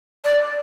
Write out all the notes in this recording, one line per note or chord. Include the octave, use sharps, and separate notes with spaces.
D5